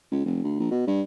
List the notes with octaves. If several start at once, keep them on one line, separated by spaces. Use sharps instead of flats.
C#2
F1
D2
A#1
B2
G2